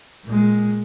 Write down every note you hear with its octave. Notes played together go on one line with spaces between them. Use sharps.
A#2 G#3